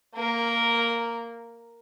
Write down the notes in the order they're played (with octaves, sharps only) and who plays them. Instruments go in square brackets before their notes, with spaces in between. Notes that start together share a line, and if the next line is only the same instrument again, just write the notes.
[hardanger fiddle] A#3 A#4